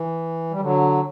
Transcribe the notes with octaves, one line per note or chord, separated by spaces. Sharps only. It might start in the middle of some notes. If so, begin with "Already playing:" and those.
Already playing: E3
G3
D3 F#3